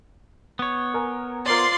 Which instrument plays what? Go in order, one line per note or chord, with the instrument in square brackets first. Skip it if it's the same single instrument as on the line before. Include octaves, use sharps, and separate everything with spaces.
[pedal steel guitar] B3 C#5
[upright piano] A#4 G#5
[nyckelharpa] F4 D5 [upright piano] A#4 C5 [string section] C6